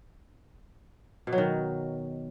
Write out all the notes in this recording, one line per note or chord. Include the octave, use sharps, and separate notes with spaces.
B2
F#3
D#3